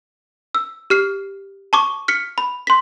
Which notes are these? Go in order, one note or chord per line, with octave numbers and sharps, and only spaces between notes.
E6
G4 F6 C7
A5 C#6 D6
F6 B6 C#7
B5
C6 B6